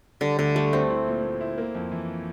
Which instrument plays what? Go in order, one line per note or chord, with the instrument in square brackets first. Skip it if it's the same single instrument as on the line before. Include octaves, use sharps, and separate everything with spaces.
[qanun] D3 [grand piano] G3
[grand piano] D2 [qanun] D3
[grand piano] G3 [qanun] A3
[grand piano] D2 [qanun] C4
[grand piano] E4
A#2
A#2
E4
A#3
F2
E3